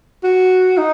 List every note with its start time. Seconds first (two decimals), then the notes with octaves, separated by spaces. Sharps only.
0.24 F#4
0.78 D#4